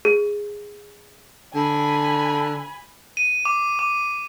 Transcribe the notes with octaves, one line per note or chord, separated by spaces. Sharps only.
G#4
D3 G#5 B5
D#7
D6
D6